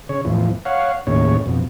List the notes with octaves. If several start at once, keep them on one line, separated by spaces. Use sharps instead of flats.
C#3 C#5
E2 A2 F3
C#5 F5 F#5
D#2 A2 C#3 C#5
F2 B2